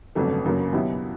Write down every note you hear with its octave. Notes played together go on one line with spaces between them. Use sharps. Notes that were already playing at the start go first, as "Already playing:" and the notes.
G1 F2 C#3 F#3 A3
G1 F#2 C#3 F#3 A#3
B2 F#3 B3 E4 G4